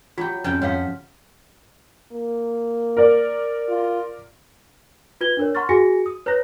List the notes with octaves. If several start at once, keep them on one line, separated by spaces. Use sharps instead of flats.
F#3 F4 G4
F2 C#3 G5
F2 F4 C#5 F5 F#5
A#3
A#4 D5
F4
F4 B4 G#6 G7
D4 A#4 C#5
F#5 A#5 C6 C#6 F6 A6
F#4 G#4 G#5 A#6 C#7
D#6
B4 C#5 A#5 F#6 A#6